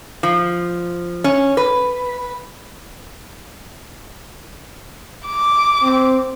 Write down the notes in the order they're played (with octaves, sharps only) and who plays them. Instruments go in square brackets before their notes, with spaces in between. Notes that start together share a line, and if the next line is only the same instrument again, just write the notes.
[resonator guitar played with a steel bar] F3
C#4
B4
[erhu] D6
[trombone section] C4